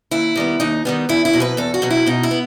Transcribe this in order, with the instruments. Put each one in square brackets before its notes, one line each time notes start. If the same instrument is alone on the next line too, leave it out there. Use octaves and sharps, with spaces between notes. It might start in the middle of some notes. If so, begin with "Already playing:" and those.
[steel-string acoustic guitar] D#2 E4
D#3 G3 B3
D#2 D#4
D#3 G3 B3
E2 E4
E4
B2 F#3 C4
B4
E2 A4
F#4
B2 F#3 C4
E4
B2 D#4
E4
B3